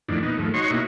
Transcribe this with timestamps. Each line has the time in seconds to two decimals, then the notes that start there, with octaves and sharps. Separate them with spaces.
0.09 F2 A2 D#3 E3 D4
0.23 A#2 B3 D#4
0.37 D#2 G#2 F3 A3
0.54 D#4 F#4 C#5 C6 C#6
0.70 B2 A#3 D#4 E4 F#4